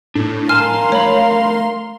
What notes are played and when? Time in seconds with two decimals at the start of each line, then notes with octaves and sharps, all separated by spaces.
0.15 A2 D4
0.49 A#4 F5 G#5 A5 C6 F6
0.92 A3 C#5 B5